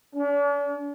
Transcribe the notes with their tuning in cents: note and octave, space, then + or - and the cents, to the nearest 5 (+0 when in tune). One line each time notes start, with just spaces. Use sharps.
D4 -45